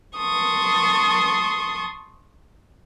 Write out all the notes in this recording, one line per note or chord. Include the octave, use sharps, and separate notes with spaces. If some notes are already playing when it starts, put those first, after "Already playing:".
A5 C6 C#6 D#6